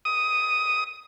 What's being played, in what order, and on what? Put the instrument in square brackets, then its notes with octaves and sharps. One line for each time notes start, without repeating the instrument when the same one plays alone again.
[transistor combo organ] D#6